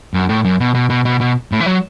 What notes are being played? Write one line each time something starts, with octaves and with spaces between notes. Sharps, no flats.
F#2
A2
F#2
B2
B2
B2
B2
B2
A2
E3
F#3